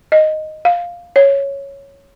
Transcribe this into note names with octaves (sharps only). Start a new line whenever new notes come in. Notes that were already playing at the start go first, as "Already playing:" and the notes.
D#5
F5
C#5